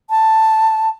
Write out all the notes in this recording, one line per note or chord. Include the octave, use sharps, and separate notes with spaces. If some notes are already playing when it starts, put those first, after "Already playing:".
A5